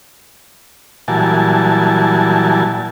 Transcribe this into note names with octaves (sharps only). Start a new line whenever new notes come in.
A#2 E3 F#3 G3 G#5 A5